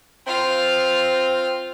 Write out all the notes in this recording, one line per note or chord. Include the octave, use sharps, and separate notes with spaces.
C4 F4 F5